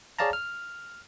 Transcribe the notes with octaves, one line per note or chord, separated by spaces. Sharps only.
G#4 C#5 D5 F5 A5 A#5
F6